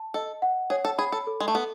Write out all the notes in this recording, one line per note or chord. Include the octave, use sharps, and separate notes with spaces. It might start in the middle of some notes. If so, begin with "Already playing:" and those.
Already playing: A5
A4 D#5
F#5
G#4 C#5
A4
G#4 B5
A4
A4
G#3
A3
B3 A4